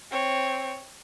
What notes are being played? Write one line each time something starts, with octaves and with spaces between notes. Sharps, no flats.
C4 C#5